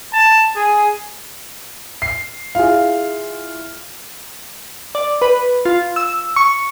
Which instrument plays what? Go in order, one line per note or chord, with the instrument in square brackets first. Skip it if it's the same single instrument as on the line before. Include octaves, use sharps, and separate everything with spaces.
[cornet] A5
G#4
[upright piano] C7
[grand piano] E4 F4 G#4 [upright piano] F5
[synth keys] D5
B4
F4
E6
C#6